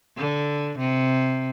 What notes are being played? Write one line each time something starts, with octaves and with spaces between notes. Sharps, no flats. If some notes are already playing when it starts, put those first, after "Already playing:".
D3
C3